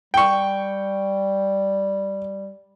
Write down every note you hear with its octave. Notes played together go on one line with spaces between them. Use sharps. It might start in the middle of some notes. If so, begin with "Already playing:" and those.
G3 G5 C#6